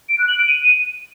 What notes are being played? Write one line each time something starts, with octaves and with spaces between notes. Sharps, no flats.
D7
F#6
F#7
D7
D#7